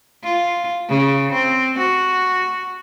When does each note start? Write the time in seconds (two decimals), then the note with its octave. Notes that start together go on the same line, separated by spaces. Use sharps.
0.23 F4
0.88 C#3
1.32 C4
1.79 F#4